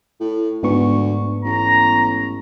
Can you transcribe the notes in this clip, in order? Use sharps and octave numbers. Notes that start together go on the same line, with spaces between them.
A2
D2 G#2 B3 C#6
A1 A#5